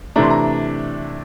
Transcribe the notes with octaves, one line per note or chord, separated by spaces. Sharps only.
C3 E3 A3 D4 A#5
C6
A#5